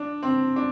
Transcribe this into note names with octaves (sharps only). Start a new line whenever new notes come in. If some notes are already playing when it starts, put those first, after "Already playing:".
Already playing: D4
C4
D4